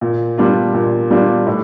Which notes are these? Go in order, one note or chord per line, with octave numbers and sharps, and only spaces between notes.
A#2
G3 D4 F4
A#2
G3 D4 F4
A2